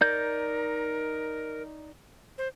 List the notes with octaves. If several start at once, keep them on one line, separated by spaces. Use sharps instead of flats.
D#4 A#4 D5 G6
C5